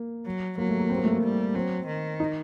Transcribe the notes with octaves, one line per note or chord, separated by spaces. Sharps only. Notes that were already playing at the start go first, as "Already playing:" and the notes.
Already playing: A#3
F#3
F#3 A#3
A3
A#3
C4
A#3
A3
A#3
G3
F#3 C4
D#3
D#4